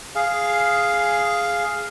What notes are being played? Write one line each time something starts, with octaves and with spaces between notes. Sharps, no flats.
G#4 F5